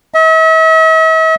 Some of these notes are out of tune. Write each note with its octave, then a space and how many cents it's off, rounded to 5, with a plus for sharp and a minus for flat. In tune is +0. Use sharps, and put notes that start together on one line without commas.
E5 -45